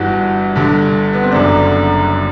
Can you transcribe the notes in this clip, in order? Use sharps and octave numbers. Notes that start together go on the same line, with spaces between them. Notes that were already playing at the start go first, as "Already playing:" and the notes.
Already playing: G1 G2 E3 F#4
G1 G2 D3
B3
C4
F#1 F#2 D3 D4